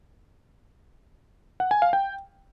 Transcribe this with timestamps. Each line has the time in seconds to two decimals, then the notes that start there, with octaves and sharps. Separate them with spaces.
1.60 F#5
1.71 G#5
1.82 F5
1.93 G5